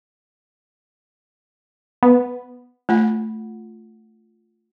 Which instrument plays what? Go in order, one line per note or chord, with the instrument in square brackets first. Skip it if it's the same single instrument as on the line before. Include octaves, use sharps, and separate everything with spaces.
[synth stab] B3
[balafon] A3 [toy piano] D4 F4 F#5